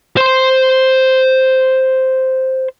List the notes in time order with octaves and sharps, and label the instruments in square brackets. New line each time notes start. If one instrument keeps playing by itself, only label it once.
[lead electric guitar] C5 C6